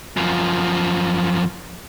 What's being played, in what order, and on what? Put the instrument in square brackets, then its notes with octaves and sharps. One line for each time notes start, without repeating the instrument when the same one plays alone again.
[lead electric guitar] F#2 F3